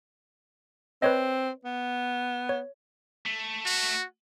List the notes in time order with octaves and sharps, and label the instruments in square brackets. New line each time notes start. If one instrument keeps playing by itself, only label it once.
[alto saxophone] C4 [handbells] B4 C#5 D#5
[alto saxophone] B3
[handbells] C#5
[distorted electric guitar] A3
[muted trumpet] F#4